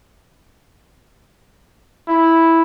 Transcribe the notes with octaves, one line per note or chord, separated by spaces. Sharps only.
E4